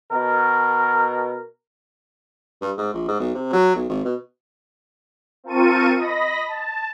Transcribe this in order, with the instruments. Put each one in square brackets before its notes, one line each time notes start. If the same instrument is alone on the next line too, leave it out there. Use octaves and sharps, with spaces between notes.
[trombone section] B2 A#4
[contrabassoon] G2
G#2
A#1
G#2
B1
C3
F#3
B1
G#1
B2
[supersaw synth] C4 F4 A#4 A5 C#6 D#7
D#5 B5 A#6
A5